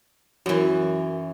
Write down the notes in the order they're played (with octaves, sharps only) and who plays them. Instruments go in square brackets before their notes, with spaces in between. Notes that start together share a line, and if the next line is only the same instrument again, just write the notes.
[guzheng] F#2 E3 [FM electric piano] F#3 C#4